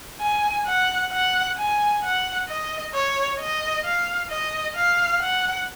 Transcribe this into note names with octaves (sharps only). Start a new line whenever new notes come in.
G#5
F#5
F#5
G#5
F#5
D#5
C#5
D#5
F5
D#5
F5
F#5